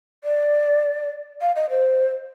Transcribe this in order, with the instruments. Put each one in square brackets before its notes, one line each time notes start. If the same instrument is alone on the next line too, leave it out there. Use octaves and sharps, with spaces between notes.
[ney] D5
F5
D#5
C5